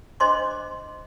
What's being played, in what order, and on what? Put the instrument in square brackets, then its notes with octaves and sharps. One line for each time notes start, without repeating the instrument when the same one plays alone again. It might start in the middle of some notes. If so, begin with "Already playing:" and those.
[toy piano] D4 C5 D#5 C6 D6